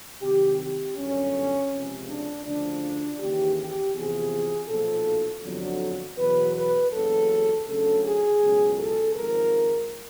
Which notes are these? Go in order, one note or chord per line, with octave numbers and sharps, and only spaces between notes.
C2 C3 D#3 F#3 G4
G4
G1 F#2 D3 C#4
C#2 C3 F3
D4
D2 C#3 F3 D4
D#2 C#3 E3 G4
G4
E2 C3 F3 G#4
B1 A#2 F3 A4
G1 F2 D3 F#3
E2 B2 F#3 B4
B4
F#1 E2 C#3 F#3 A4
D2 C#3 F#3 A4
G#4
C#2 B2 F#3
A4
G#1 G#2 F3 A#4